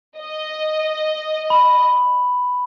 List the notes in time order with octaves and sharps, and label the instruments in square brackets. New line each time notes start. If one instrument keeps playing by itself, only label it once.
[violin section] D#5
[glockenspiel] B5